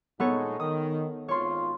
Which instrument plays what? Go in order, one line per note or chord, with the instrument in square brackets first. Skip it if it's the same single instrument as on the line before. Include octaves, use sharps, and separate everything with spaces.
[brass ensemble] A#2 G#3 D#4 [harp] B3 A4 C#5
[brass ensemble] D#3 [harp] D#6
[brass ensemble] G#1 F4 [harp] C#5 C6